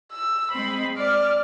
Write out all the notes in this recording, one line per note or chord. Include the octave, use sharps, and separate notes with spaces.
E6
G#3 C4 B5
D5 F6